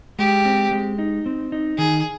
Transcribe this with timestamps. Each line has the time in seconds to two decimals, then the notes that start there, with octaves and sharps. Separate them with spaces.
0.19 G#3 G4
0.45 C4
0.71 G#3
0.98 D#4
1.26 C4
1.52 D#4
1.78 D#3 G#4